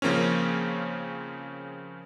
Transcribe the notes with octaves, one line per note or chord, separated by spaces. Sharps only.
C#3 F3 A#3 C4 C#4